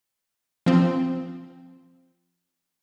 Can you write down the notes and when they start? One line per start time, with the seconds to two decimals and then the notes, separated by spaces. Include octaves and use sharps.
0.66 F3 C4